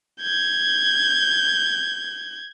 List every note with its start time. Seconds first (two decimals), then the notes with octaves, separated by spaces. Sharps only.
0.21 G6 G#6